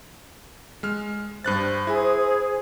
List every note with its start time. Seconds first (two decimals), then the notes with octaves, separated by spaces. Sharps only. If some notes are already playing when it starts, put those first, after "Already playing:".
0.83 G#3 F6
1.44 G2 C5 F#6 A6
1.87 E4 G#4